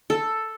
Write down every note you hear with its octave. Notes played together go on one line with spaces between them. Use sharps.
A4